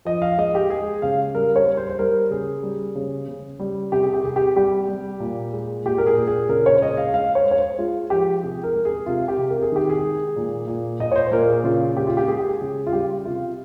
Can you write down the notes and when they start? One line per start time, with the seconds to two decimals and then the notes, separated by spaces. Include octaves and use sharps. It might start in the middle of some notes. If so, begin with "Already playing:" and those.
0.05 F3 D#5
0.22 F5
0.38 G#3 D#5
0.55 G4
0.70 G#3 G#4
1.02 C#3 F5
1.34 G3 A#4
1.56 C#5
1.67 G3
1.77 C5
1.89 C5
1.99 G3 A#4
2.31 C#3 G#4
2.63 G3
2.95 C#3
3.28 C#3
3.59 G3
3.92 C3 G4
4.03 G#4
4.14 G4
4.24 C3 G#4
4.36 G4
4.56 G3 G4
4.88 G3
5.20 A#2
5.52 G#3
5.85 A#2 G4
5.98 A#4
6.07 G#4
6.17 A#2
6.27 G#4
6.49 C#3 A#4
6.66 C#5
6.81 G#3 D#5
6.97 F5
7.14 G#3 F5
7.35 C#5
7.45 G#3
7.51 C#5
7.56 C5
7.79 G#3 F4
8.10 F3 G4
8.43 C3 G#4
8.63 A#4
8.74 G#3
8.85 G#4
9.06 C3 F4
9.28 G4
9.39 C3
9.50 A#4
9.62 G#4
9.72 D#3 G4
9.89 G#4
10.03 G#3
10.36 A#2
10.67 A#2
11.00 A#2 D#5
11.12 C#5
11.16 C5
11.32 A#2 A#4
11.48 G#4
11.64 C#3 F4
11.97 G#3 G4
12.07 F4
12.17 G4
12.28 G#3 G#4
12.39 G4
12.48 G#4
12.62 C#3
12.87 F4
12.92 G3 G4
13.25 C3 F4